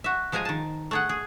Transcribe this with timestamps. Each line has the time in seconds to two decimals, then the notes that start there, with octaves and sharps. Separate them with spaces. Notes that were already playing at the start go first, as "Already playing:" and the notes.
0.04 F#4 E5
0.32 F3 G#3 C5 G#5 A#5
0.45 D#3 A5
0.91 A3 G#4 F#5
1.09 G#4